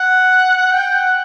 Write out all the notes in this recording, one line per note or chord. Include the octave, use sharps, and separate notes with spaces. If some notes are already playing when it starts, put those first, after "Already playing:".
Already playing: F#5
G5
F#5